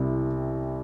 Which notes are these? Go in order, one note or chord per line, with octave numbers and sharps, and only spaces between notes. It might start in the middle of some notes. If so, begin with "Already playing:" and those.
Already playing: C2 C3 E4